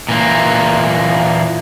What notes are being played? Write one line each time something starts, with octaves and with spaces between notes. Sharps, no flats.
A#2 E3 A#3